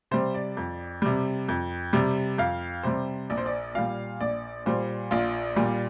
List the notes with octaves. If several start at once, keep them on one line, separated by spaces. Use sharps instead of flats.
C3 G3 C5
D5
F2
C3 G3
F2
C3 G3
F2 F5
C3 G3 C5
A#1 D5
C5
D5
A#2 G3 F5
A#1 D5
A#2 G3 C5
A#1 F4
A#2 G3